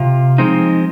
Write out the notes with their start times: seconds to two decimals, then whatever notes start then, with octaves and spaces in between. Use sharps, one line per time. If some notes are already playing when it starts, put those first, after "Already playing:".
Already playing: C3 F4
0.38 F3 G#3 C4 D#4